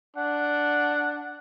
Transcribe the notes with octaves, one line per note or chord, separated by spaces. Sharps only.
D4 F#5